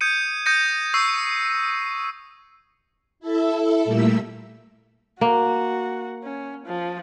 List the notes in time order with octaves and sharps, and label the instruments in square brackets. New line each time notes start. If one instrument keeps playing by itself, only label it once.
[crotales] D#6 G6 G#6 C#7 D#7
D#6 G6 A#6 C#7 D#7
C#6 E6 G6 C7
[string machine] E4 A4 E5
A#2 G3 A3 A#3 E6 B6
[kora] A#3 [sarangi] F#4
[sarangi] C#4
F3